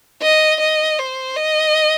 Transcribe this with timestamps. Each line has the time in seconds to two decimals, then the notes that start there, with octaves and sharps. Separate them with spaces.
0.22 D#5
0.60 D#5
0.99 C5
1.37 D#5